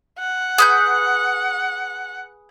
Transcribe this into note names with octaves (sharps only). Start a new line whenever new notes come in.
F#5
G#4 B4 G6